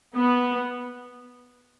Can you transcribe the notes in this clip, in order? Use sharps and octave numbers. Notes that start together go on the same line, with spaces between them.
B3